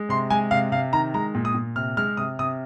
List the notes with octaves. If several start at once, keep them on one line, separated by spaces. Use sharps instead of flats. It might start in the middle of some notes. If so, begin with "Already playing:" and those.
Already playing: G#3
C3 C6
G#3 G#5
C3 F5
C3 F5
D#3 A#5
G#3 A#5
A#2
D#6
A#2
C3 F6
G#3 F6
C3 D#6
C3 D#6